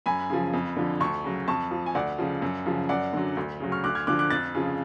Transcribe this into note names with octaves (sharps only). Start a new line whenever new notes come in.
F#2 G#5 B5
C#3 F3
F2
D3 F3
D2 A5 C#6
C#3 F#3
F2 A5 C#6
F3
G#5
D2 D5 F#5
C#3 F3
F#2
C#3 F3
F#2 D5 F#5
D3 F#3
D2
C#3 F#3
C#6 F6
D2 D6 F#6
F6 G#6
D3 F3 D6 F#6
D6 F#6
F2 F#6 A6
C#3 F3